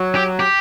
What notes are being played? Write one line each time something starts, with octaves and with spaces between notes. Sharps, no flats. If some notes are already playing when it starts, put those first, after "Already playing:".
Already playing: F#3
G4
G4